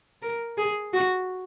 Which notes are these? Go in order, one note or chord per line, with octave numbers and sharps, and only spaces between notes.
A#4
G#4
F#4